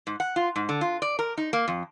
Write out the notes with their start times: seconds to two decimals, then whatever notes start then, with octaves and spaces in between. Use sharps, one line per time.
0.07 G#2
0.20 F#5
0.36 F4
0.56 G#2
0.69 D3
0.81 F4
1.02 D5
1.19 A#4
1.38 D#4
1.53 A#3
1.68 F2